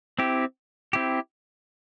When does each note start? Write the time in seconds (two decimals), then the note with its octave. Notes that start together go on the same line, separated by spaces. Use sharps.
0.19 C4 E4 G4
0.93 C4 E4 G4